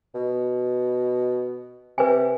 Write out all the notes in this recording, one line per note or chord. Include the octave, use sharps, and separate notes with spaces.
B2
C3 B4 G#5